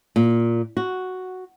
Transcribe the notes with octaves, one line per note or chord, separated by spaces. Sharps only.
A#2
F#4